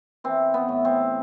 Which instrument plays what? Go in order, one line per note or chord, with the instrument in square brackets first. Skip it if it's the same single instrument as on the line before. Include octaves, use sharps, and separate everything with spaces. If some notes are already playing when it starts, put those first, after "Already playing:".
[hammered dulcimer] E3 C4
B3
A2
C4